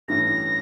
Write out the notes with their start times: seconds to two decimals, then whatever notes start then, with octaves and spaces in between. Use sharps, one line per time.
0.08 A1 G2 E3 A3 C#4 A#6